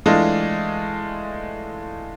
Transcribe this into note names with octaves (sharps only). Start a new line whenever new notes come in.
E3 G#3 A3 D4 F4 D#5